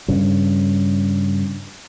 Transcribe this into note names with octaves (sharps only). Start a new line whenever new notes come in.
G2 C#3